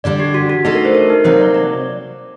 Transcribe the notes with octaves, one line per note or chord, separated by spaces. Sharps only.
D3 G3 D4 D5
G4
F#4
F#4
A3 D4 D#4 A4 D#5
A#4
C5
A#4
D#4
C3 F#3 A#3 D#4 F#4 C5
D5
D5